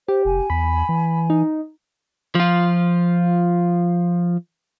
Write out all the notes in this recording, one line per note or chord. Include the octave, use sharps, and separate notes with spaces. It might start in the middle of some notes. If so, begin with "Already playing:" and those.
G4 C5
F1 G#5
E2 B5
E3
D#4
F3 F4